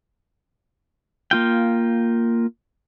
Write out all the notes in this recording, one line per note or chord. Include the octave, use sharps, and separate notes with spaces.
A#3 F4 G5